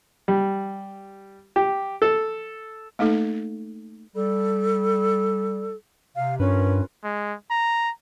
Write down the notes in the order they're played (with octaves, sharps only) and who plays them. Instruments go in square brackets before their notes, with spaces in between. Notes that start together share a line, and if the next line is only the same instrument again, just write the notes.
[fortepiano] G3
G4
A4
[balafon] A3 A#3 D#4 A4
[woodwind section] G3 [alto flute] A4
[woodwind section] C3 [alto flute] F5
[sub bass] G2 [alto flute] C#4 [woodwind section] F4 A#4 B4
[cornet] G#3
A#5